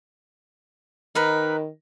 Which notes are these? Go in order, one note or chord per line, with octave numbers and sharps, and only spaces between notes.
D#3 D#4 A#4 B4